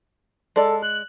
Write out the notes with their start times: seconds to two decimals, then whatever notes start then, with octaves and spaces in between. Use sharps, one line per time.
0.56 G#3 A4 D5
0.82 F#6